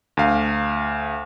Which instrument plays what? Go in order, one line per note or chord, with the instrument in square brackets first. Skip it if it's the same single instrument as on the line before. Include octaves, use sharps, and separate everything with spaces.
[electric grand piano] D2 F5